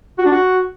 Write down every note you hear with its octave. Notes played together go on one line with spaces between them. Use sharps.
F#4
D4
F#4